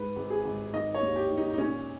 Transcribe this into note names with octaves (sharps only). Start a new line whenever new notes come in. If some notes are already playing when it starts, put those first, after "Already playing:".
Already playing: G#2 B4
G#1
G#4
G#1
D#3 D#5
C#5
D#2
G4
D#3
D#4
D#4
A#2 C#4